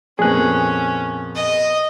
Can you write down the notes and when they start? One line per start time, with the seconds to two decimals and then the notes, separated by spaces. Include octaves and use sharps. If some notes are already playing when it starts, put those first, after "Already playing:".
0.19 F2 A#2 B3 C#4 G#4 F#6
1.35 D#5